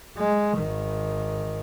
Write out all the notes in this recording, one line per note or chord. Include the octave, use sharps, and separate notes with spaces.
G#3
G#1 D#3